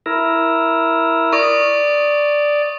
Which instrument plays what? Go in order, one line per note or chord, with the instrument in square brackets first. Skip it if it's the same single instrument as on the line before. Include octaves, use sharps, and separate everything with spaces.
[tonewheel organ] E4 A#4
[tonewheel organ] D5 [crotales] C#6 D#6